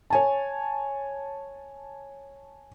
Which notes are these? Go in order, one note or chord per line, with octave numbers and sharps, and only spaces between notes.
C#5 G#5 A5